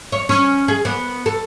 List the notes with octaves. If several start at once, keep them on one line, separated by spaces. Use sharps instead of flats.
C#5
C#4
G#4
B3
A4